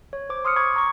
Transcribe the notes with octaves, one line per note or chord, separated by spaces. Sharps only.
C#5
C5 D6
C6 D#6 F6 C#7
B5 C#6 D6 G#6
A#5 C#6